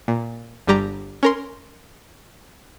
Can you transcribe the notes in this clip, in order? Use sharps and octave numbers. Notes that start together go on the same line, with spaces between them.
A#2
G1 G2 G3 G4 A#5
C#4 A#4 C6